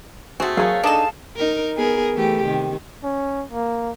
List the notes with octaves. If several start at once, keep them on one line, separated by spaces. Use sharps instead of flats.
A3 C4 F#4 G#4
F#3 G#4 F5 C#6
D4 D#4 A4 D#5 A5 E7
D#4 A#4
B3 G#4 A#4
E3 A3 G4
C3 D#3
C#4
A#3